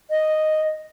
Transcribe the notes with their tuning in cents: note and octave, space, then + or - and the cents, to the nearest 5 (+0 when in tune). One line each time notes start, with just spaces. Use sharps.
D#5 -5